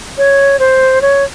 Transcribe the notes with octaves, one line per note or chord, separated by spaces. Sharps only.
C#5
C5
C#5